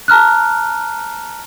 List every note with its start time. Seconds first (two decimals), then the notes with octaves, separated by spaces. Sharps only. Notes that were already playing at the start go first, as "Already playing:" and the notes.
0.08 A5 A#5 F6 F#6